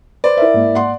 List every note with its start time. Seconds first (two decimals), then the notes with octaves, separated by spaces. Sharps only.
0.24 B4 C5 D5
0.37 E4 A#4 E5
0.54 G#2 A#3
0.75 F#5 C6